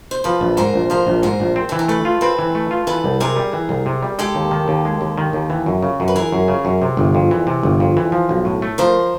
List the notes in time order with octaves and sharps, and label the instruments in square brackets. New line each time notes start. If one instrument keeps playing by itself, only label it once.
[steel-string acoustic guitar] C5
[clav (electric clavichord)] F3 [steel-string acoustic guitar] A4 B4
[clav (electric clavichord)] A#1
[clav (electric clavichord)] G#2 [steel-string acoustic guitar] A#4 C5
[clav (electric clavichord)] A#1
[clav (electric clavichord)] F3 [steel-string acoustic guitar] A#4 C5
[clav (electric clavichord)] A#1
[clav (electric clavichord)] G#2 [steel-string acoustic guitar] A#4 C5
[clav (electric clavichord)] A#1
C4
[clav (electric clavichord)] E3 [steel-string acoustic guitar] A4
[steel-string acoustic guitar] A#4
[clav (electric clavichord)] A3 [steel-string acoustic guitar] A4 B4
[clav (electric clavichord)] F4
[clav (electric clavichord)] C4 [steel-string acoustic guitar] A4 B4
[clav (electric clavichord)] E3
A3
F4
[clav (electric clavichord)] E3 [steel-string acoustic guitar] A4 B4
[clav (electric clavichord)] C2
[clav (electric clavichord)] C3 [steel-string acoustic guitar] G#4 A#4
[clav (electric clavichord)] G3
E3
C2
C3
G3
[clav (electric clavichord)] G#3 [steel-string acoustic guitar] G4 A4
[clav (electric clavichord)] D#2
D#3
D#2
G#3
D#2
D#3
D#2
E3
F#2
C#3
F#2
[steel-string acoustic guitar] B4
[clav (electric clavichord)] E3 [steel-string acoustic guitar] G#4 A#4
[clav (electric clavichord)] F#2
C#3
F#2
C3
G1
F2
E3
C3
G1
F2
E3
F3
B1
A2
A3
[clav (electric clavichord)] F3 [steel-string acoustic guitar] A#4 C5